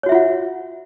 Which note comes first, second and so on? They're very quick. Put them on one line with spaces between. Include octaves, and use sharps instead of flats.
C#5 F#4 E5 F4 F#5